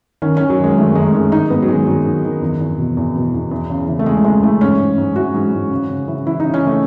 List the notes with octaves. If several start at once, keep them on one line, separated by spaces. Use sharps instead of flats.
D#3 C#4
D#3 C#4
F#3
F#2
G#3
D#3 A3
F#2 G#3
D#3 G#3
G#2 D#4
G#2 B3
F#3
D#3 G#3
G#2 F#3
D#3
D#3
E2
E2
B2
E2
B2
E2
E2
C#3
E3
A3
C#3 G#3
E3 G#3
E3 A3
G#2 C#4
G#2
G#2
E3 F#4
G#2
G#2
C#3
C#3
E3
E3 E4
C#3 D#4
C#4
E3 A3